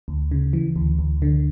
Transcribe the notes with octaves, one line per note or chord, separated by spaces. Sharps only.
D2
C#3
E3
D2
D2
D3